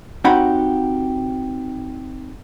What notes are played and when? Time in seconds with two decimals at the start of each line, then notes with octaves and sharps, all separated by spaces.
0.24 C4 D#4 F#4 G4 F#5 B5